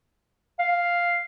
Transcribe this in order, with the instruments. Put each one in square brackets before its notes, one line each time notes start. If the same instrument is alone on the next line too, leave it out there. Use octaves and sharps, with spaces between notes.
[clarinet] F5